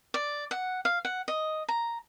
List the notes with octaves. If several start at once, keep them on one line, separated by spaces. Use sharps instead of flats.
D5
F#5
F5
F#5
D#5
A#5